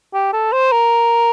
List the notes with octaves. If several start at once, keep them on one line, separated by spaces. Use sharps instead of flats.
G4
A4
C5
A#4